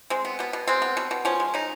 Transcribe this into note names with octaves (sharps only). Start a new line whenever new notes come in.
G#3 C4
B3
B2 B3
B2
G#3 C4
B3
B2
B2
F3 C#4
G#3
C#3 D#4